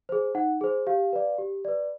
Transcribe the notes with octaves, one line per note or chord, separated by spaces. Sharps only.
G#4 C5
D#4 F#5
G#4 C5
G4 F5
B4 D5
G4
B4 D5